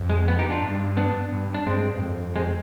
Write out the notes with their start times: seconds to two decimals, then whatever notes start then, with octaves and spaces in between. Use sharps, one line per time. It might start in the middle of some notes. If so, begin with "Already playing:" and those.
Already playing: F2
0.10 G#3
0.28 B3
0.39 D#4 G4
0.50 D4 F4
0.62 G2
0.97 B3 D4
1.32 G2
1.54 D4
1.67 G2 G#3 C4
1.97 G2
2.01 F2
2.36 G#3 C4